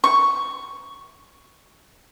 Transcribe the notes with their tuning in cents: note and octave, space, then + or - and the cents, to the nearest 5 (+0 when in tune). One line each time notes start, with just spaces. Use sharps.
C#6 +5